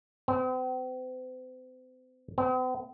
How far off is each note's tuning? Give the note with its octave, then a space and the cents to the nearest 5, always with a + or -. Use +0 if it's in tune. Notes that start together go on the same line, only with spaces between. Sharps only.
C4 -40
C4 -45